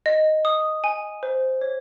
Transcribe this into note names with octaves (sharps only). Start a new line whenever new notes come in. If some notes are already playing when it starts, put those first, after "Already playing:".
D#5
D#6
G#5
C5
C#5